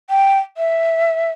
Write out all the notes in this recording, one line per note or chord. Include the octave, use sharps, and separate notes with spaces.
G5
E5